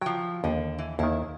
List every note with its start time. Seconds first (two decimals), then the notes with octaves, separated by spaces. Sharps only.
0.01 F3 F#3 G5
0.44 D#2 D3
0.79 E3
0.99 D#2 D#3 E4